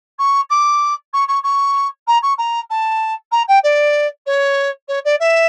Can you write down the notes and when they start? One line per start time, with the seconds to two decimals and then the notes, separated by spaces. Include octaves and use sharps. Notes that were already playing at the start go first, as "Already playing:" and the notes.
0.19 C#6
0.50 D6
1.13 C#6
1.28 C#6
1.44 C#6
2.07 A#5
2.22 C#6
2.38 A#5
2.70 A5
3.32 A#5
3.48 G5
3.63 D5
4.26 C#5
4.88 C#5
5.05 D5
5.20 E5